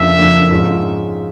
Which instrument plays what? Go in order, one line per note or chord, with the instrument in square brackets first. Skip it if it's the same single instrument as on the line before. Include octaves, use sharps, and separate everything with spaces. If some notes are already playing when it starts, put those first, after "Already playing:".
Already playing: [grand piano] F2 C#3 F3 A#3 D4 [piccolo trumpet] E5
[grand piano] F2 C#3 F3 A#3 D4
G#2 F3 G#3 C#4 F4